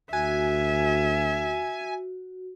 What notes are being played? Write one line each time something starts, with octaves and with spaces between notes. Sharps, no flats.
D2 F#4 E5 G#5